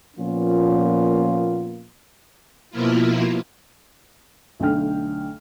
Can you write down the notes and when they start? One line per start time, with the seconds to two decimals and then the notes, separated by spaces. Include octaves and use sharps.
0.17 A#2 F3 A#3 B3 C#4 F4
2.71 B2 F3 A#3 E4 F4
4.60 B1 D3 A3 D4 G5 F6